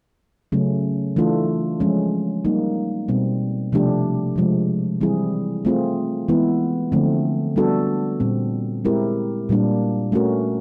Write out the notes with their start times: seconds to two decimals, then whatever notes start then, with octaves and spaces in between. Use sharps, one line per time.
0.52 C#3 F#3 A3 C#4
1.16 E3 A3 D4 F4 A4
1.80 F3 G#3 C#4
2.45 G3 A#3 D#4
3.08 B2 G3 C4
3.72 C3 F3 A3 D4 G4
4.36 C3 F3 G#3
5.01 E3 G3 C4 E4 G#4
5.65 A3 C4 F4 G#4
6.28 E3 G#3 B3 E4
6.92 D3 F3 A3 C4
7.56 G3 B3 D4 F#4 A4
8.20 A#2 G3 C4
8.85 G#3 C4 E4 G4 A#4
9.49 A#2 G3 A#3 D4
10.12 A3 C#4 F#4 A#4